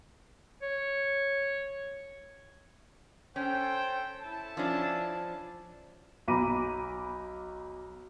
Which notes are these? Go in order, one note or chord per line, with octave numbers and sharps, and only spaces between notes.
C#5
C#4 A4 C5 G5
E4 A4 A5
F3 C#4 D4
B1 A#5 B5 D6 D#7